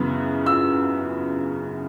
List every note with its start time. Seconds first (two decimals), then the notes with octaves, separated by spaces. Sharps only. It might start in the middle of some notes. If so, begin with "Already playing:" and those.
Already playing: F#2 C#3 E3 B3
0.46 E6